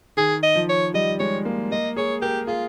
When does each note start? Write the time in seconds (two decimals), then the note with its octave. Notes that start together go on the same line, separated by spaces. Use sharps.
0.17 D#3 G#4
0.43 D#5
0.55 F3
0.69 C#5
0.94 G3 D#5
1.20 G#3 C#5
1.45 A#3
1.71 A#3 D#5
1.96 G#4 C#5
2.22 G4 A#4
2.47 F4 G#4